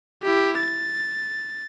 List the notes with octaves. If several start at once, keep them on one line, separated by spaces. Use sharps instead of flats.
E4 G4
A6